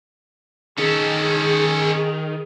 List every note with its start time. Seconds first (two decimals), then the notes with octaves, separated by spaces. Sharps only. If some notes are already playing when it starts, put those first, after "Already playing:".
0.78 D#3 C#4 G#4 A4